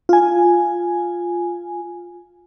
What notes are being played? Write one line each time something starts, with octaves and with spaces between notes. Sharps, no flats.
F4 G#5